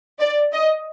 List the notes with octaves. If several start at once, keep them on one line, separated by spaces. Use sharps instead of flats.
D5
D#5